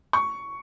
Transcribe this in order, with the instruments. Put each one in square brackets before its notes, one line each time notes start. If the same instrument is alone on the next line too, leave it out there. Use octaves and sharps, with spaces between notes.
[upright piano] C#6